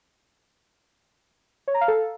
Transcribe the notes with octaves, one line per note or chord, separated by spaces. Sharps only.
C#5
A#5
F5
A4